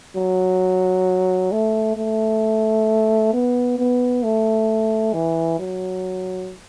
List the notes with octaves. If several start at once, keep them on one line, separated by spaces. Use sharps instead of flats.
F#3
A3
A3
B3
B3
A3
E3
F#3